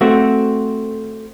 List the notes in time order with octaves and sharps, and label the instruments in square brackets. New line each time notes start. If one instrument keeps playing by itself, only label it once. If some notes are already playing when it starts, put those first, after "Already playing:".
[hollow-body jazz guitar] A3 C4 F#4